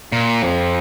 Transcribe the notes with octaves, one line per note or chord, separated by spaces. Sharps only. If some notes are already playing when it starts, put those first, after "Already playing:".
A#2
F2